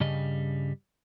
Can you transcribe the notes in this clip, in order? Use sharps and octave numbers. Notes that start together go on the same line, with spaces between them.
G2 C#3 G3 D#5